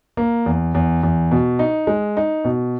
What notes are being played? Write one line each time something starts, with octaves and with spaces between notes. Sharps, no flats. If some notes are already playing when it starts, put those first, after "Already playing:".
A#3
E2
E2
E2
B2
D#4
G#3
D#4
B2